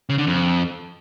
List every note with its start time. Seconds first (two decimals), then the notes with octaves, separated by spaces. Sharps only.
0.09 C#3
0.18 D3
0.27 F2